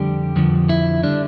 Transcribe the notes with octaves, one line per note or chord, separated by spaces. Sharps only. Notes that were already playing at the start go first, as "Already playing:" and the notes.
Already playing: F2 D3 G3 G4
F2 D3 F3
E4
D3 G3 D4